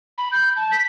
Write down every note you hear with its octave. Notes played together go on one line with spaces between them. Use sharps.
B5
G6
A5
B6